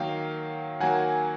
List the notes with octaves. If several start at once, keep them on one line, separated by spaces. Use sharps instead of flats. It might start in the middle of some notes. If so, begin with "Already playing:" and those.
Already playing: D#3 F#3 A#3 F5 G5
D#3 F#3 A#3 F#5 G#5